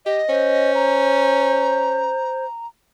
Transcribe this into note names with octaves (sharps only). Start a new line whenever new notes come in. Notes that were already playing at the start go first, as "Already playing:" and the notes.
G4 D#5
C#4 C5
A#5